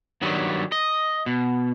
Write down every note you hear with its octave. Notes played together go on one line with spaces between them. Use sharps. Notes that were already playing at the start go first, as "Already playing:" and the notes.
G2 D#3 F#3 G3
D#5
B2